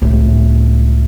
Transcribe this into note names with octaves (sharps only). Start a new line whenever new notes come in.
C#2 A2